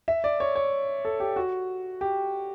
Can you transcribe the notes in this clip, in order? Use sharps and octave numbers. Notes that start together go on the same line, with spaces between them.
E5
D5
C#5
C#5
A4
G4
F#4
G4